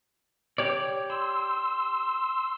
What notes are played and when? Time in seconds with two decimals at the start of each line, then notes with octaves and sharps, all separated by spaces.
0.58 G4 C#5 D5
1.10 C6 E6